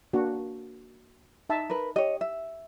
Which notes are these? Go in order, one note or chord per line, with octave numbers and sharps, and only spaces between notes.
A#3 D4 F#4
D#4 E5 A5
A#4 B4
G4 C#5 D#5
E5